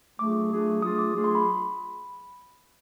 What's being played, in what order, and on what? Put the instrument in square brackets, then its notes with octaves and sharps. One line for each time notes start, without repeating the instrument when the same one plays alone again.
[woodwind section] F#3 A3 D4 F4 G#4 [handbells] D6
[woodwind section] F#3 A3 D4 F4 G#4
[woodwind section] F#3 A3 D4 F4 G#4 [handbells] D#6
[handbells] D6
[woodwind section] F#3 A3 D4 F4 G#4
[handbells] C6
B5